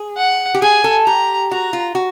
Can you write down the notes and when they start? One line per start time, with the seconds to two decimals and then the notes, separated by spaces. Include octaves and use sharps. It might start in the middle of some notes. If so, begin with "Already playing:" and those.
Already playing: G#4
0.17 F#5
0.54 G4
0.62 G#4 G#5
0.84 A4
1.06 G4 A#5
1.51 F#4 A#5
1.73 F4
1.95 F#4